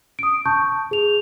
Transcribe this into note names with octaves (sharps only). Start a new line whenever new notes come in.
D#6 D7
A5 C#6 G6
G#4 F7